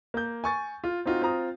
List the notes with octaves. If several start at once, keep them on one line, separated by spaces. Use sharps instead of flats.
A#3 G6
G#5 C#6 A6
F4
C4 D#4 F4 F#4
C4 F4 A#5 D#6